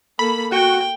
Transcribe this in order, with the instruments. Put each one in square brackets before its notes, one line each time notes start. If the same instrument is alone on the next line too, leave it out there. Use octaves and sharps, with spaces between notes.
[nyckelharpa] A#3 A4 [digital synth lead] B5
[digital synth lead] F#4 [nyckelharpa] G5